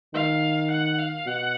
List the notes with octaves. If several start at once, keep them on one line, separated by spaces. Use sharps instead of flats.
D#3 F5
F#5
F5
B2 F#5